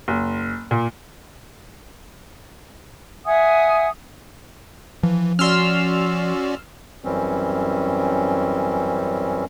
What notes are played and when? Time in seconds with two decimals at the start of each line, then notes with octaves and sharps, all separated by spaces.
0.08 F#1
0.71 A#2
3.24 E5 F#5 G#5 D#6
5.03 E3 F3
5.39 C#4 F#4 D5 C6 E6 F6
7.04 F#2 E3 G3 C4 C#4